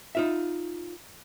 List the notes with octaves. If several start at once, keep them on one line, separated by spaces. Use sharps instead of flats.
D#4 F4 E5